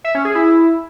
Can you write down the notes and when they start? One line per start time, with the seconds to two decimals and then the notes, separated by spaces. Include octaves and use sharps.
0.04 E5
0.15 C#4
0.25 G#4
0.35 E4